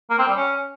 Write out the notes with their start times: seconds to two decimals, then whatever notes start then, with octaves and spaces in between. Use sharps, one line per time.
0.10 A#3
0.19 C4
0.28 G3
0.36 C#4